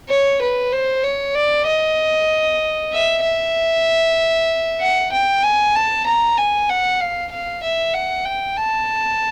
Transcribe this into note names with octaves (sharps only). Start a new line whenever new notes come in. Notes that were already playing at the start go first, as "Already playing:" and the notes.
C#5
B4
C5
C#5
D5
D#5
E5
E5
F#5
G5
G#5
A5
A#5
G#5
F#5
F5
F5
E5
F#5
G5
A5